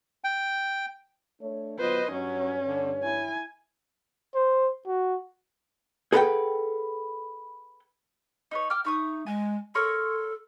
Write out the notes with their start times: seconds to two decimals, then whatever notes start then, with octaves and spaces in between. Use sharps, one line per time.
0.24 G5
1.42 A3 D4 C#5
1.79 F#3 B3 F4 B4 C5 D#5
2.11 G2 F#3 C#4 C#5
2.66 D3
3.03 E4 G#5
4.35 C5
4.87 F#4
6.12 G#4 A4 B4 D5 F#5 G5
8.51 D#4 B4 C#5
8.70 G5 D6 F6
8.85 D#4 E5 C#6 D#6
9.26 G#3 G#5
9.75 A4 A#4 C#5 C6